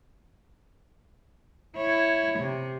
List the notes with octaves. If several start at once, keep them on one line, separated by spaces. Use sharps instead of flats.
E4 C#5
C3